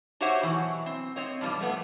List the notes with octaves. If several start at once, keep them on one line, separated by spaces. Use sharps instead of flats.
F#4 G4 C5 C#5 E5 F#5
B2 E3 F#3
C4
C4 C#5 D#5
G2 B2 F3 G3
F2 A3 B3